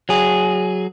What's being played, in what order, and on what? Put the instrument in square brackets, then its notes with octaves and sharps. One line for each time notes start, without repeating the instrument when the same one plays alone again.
[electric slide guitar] F#3 G#4